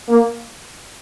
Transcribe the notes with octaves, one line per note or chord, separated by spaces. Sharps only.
A#3